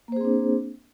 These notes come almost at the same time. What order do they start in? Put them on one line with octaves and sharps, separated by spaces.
A#3 C5 G#4 C4 D4